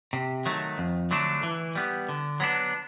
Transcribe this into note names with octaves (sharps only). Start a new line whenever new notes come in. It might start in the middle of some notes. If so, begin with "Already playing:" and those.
C3
D#3 F#3 A3
F2
D3 F#3 A3 D4
E3
G3 B3
D3
F#3 B3 D4